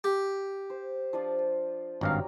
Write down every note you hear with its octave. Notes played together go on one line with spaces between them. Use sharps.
G4
C5
F3 D4 F4
G#1 G2 F#3 G3 F5 A#5